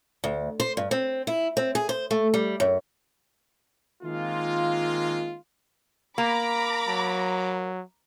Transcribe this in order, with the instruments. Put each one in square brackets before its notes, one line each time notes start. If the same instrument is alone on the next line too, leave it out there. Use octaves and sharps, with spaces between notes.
[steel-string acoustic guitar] D2
C5
G2
C4
E4
C4
G#4
C5
A3
G3
F#2
[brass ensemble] D#3 G#3 A#3 C4 F4
[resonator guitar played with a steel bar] A#3 [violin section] A#5 B5 D6
[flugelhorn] F#3